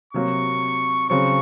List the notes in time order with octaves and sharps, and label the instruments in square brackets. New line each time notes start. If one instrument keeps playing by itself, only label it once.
[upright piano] C3 F#3 A#3 [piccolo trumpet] C#6
[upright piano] C#3 F#3 C4 [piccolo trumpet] C#6